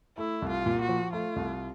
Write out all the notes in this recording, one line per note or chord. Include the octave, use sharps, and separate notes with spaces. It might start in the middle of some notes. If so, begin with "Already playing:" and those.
A3 E4
C2
F4
A#2
F#4
F3
A3 F4
C2